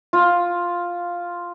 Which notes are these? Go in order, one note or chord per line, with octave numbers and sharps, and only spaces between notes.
F4